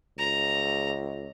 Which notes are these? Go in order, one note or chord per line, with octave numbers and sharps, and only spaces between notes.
C#2 A#5